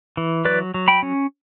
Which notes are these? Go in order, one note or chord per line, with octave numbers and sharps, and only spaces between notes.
E3
F#3 B4 D5
F#3
G5 B5
C#4